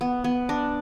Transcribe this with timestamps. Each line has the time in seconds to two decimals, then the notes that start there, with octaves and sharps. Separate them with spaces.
0.01 B3
0.24 B3
0.49 D4